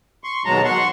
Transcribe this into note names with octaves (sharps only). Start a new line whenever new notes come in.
C6 C#6
D#2 B2 F#3 G#3 A5 A#5
F#5 C6 C#6